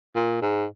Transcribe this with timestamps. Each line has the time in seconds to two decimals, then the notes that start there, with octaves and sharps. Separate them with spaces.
0.15 A#2
0.42 G#2